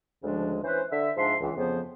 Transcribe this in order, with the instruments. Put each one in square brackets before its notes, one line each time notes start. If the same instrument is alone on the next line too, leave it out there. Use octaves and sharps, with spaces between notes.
[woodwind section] D2 C#3 F3 G#3 D4
E3 C#4 B4 C5
D3 E5
G#2 F3 D4 E5 C6
C#2 E3
F2 C#3 F3 B3 C5